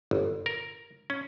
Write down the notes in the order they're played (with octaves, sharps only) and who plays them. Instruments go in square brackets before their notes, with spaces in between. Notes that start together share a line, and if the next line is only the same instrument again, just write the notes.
[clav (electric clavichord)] G1
A#4
C#4